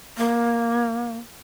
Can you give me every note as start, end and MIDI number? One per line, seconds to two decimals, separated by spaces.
0.18 1.16 58